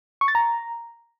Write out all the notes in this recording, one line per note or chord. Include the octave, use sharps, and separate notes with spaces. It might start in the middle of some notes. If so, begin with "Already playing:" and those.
C#6
A6
A#5